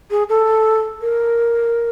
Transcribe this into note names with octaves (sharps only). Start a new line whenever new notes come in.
G#4
A4
A#4